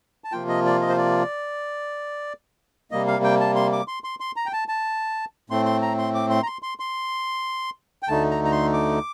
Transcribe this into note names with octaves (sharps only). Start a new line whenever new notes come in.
A5
C3 F3 A#3 F4 G5
D#5
D5
D#5
C5
D5
C3 G3 A#3 D#5
F5
G5
A5
C6
D6
C6
C6
C6
A#5
G5
A5
A5
A2 A3 C4 C6
C6
A#5
C6
D6
C6
A#5
C6
C6
C6
G5
D2 D3 A3 D#4 A5
A#5
A#5
C6
D6